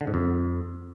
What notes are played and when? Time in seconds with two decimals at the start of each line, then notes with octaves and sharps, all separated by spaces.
0.01 D3
0.07 G#2
0.14 F2